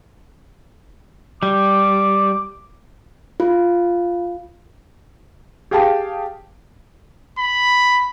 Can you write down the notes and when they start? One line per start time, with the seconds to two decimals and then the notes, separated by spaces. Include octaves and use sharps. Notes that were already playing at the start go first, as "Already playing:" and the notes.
1.43 G3 D6
3.40 F4
5.71 G4 G#4 F5 G5 A5
7.39 B5